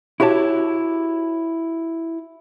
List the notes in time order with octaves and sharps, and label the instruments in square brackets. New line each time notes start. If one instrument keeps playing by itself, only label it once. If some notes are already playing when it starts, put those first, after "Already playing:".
[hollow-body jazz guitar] E4 F#4 G4 C#5 A5